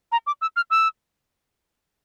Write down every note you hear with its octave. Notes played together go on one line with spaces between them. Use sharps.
A#5
D6
E6
F6
E6